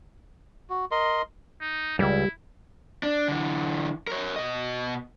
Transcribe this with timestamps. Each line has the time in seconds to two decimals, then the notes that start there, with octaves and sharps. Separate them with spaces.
0.70 F#4
0.91 A#4 D#5 C6
1.62 D#4
1.99 C#2 F#2 G3 E4
3.03 D4
3.28 D3 E3
4.07 A#4 C#5
4.36 B2 D#5